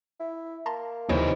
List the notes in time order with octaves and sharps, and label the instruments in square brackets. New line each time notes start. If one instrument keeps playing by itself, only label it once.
[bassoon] E4
[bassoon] A#3 [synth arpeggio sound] A5 A#5 C6
[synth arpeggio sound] D#2 C#5 D7 [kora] C3 E3 G#3 [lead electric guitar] F3 D#4